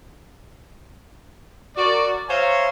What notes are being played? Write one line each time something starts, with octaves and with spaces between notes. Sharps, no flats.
F#4 A#4 D5
C5 C#5 E5 F5 G#5 A#5